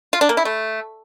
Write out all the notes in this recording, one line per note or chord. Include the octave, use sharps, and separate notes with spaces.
F4
D4
A#3
E4
A3